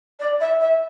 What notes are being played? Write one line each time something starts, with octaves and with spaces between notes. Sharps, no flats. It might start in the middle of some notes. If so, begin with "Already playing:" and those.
D5
E5
E5